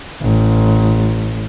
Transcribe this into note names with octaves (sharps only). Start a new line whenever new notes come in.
A1